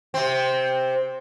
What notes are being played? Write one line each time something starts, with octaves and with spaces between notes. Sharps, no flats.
C3 C4